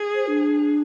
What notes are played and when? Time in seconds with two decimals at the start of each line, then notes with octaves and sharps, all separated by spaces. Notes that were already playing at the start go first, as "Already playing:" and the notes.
Already playing: G#4
0.15 C5
0.27 D4